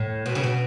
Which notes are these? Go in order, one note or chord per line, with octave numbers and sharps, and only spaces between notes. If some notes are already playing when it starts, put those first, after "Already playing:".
Already playing: A2
B2
C#3
B2